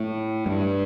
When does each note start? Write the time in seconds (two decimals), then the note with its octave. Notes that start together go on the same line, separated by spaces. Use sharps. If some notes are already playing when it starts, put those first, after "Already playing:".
Already playing: A2
0.46 G2